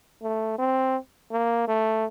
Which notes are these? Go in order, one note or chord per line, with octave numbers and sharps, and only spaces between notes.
A3
C4
A#3
A3